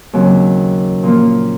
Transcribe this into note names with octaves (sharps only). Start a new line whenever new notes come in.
D#2 C#3 F#3 C4
A#2 F3 A#3